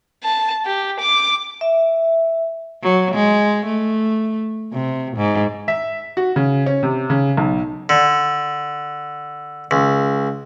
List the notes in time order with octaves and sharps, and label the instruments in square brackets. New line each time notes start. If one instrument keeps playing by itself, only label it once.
[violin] A5
G4
D6
[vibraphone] E5
[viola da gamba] F#3
G#3
A3
C3
G#2
[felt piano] E5
F#4
C#3
C#4
C3
C#3
B1
[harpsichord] D3
C#2